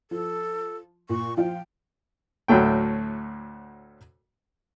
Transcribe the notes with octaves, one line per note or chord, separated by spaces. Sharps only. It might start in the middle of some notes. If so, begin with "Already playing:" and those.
F3 A4
A#2 C#6
F3 F4 G5
D2 A2 F#3 A3 G5